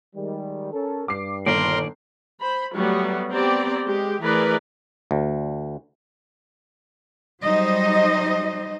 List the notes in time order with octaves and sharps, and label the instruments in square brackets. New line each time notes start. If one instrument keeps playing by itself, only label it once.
[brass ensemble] D#3 G3 G#3
C#4 A4 A#4
[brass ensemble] G2 [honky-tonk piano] D6 C7
[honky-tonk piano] G1 [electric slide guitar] A#2 D#3 D5 [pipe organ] A#4 C6
[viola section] C5 B5
F#3 G3 A3 B3
B3 C4 G4 D5 A#5
G#3 G4
E3 A3 G#4 A#4 B4 D5
[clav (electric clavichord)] D2
[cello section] F#3 G3 D#4 C5 D#5